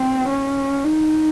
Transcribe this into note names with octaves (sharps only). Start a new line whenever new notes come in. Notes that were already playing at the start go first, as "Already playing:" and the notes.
Already playing: C4
C#4
D#4